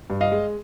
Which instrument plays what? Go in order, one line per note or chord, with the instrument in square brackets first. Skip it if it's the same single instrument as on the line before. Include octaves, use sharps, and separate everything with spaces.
[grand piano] G2
D#5 F5
G#3